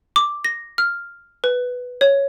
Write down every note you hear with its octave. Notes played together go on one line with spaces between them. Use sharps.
D6
A#6
F6
B4
C#5